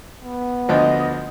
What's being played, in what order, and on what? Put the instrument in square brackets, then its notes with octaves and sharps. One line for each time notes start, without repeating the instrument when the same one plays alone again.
[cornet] B3
[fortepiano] D2 D3 F3 [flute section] D#5